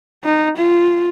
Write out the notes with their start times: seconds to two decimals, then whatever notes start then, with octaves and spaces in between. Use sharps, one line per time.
0.25 D#4
0.57 F4